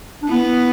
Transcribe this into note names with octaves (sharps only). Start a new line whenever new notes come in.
D4
B3 E4